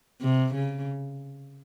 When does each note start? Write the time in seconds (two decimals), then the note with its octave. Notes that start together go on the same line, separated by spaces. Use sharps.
0.21 C3
0.54 C#3